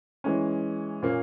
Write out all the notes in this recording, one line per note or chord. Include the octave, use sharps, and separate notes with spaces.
E3 G#3 C#4
A#2 A#3 C#4